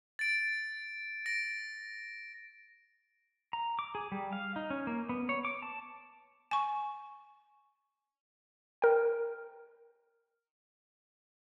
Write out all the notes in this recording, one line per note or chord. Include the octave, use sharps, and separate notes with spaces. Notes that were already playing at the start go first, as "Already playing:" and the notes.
A6 D7
A#6 D7
A#5
D6
G#4
G3
F5
D#4
C#4
A#3
B3
C#5
D6
A5
G#5 C#6
A#4 G5